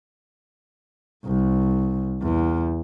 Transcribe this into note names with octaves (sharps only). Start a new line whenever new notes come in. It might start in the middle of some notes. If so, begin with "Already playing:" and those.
C2
E2